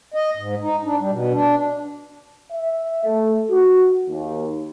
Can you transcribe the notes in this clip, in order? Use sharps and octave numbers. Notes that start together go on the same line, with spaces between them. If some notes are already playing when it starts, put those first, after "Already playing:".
D#5
G#2
D#4
D4
G3
B2
D4
E5
A3
F#4
D#2